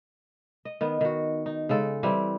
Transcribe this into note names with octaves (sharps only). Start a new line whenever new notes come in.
D#5
D#3 B3
D#3 F#4
D#4
C#3 G#3 A4
E3 G3 C4